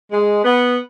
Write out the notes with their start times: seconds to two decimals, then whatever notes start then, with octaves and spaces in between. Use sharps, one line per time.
0.11 G#3
0.43 B3